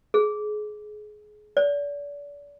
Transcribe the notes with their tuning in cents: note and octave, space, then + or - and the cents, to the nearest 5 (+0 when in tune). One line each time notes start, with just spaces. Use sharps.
G#4 +25
D5 -35